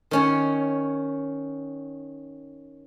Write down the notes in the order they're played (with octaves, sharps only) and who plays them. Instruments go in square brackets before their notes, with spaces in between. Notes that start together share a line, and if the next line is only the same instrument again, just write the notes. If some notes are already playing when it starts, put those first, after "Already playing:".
[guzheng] D#3 C#4 C#5